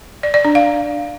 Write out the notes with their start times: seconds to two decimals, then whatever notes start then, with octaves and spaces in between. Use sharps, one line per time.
0.23 D5
0.34 D5
0.45 D4
0.55 F5